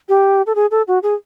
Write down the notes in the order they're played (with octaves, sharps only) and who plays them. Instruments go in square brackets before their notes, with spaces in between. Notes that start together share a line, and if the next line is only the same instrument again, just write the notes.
[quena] G4
A4
G#4
A4
F#4
G#4